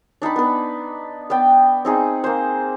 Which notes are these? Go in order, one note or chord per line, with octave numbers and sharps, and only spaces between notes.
D4 D#4 A5 B5
B3 B4
B3 D5 G5
C4 D#4 G#4
A#3 C5